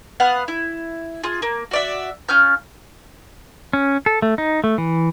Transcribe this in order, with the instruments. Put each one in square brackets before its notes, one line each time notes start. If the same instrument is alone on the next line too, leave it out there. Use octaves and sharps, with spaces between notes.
[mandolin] B3 F5 F#5
E4
F4 G#4
A#3
F#4 D5 E5
C#4 F4 F6 G6
[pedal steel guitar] C#4
A4
A3
D#4
A3
E3